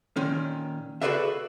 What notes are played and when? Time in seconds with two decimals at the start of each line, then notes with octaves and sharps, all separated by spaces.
0.16 A#2 D#3 C#4
1.02 F#4 G#4 A4 B4 D5 E5